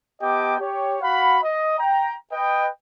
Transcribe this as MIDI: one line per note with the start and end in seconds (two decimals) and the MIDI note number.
0.21 0.55 59
0.21 0.55 67
0.21 0.55 75
0.21 0.55 79
0.21 0.55 81
0.21 0.55 86
0.60 0.96 67
0.60 0.96 73
1.02 1.39 66
1.02 1.39 77
1.02 1.39 78
1.02 1.39 83
1.44 1.78 75
1.79 2.15 79
1.79 2.15 82
2.33 2.68 71
2.33 2.68 75
2.33 2.68 79